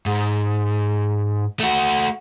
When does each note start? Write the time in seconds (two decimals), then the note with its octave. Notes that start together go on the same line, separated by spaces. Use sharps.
0.06 G#2
1.60 A3 F#4